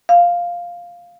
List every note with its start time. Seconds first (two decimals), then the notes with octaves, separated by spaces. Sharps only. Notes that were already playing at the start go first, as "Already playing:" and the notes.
0.09 F5